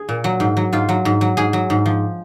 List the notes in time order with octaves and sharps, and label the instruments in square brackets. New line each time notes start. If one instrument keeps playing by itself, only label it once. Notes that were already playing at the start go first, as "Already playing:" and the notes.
Already playing: [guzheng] G#4
A#2
F#3
G#2
F#3
G#2 F4
F#3
G#2
F#3
G#2 G#4
F#3
G#2
F3